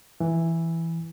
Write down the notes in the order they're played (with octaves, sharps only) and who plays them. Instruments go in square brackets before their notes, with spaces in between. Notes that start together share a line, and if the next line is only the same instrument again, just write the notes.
[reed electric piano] E3